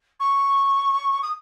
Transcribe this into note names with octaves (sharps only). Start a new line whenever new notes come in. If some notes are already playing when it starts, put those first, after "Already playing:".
C#6
D#6